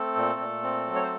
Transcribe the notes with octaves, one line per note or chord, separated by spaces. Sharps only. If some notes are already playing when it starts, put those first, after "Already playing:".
Already playing: A3 C4 A4
A#2
A#2
C4
F#3
C#5
C5